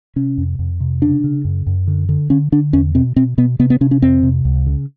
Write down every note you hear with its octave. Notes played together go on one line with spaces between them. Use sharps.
C3 C#4
F2
F2
C3
C#3 D4
C#3
F#2
F#2
D3
D3
D3 C#4
D3 D4
E2 C#4
B2 C4
B2 C4
B2 B3
C3 B3
B3
C3 C#4
C#4
F2 C4
C3
C#2
C#3